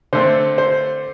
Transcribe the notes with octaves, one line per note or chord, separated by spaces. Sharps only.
D3 A3 C4 C5
C5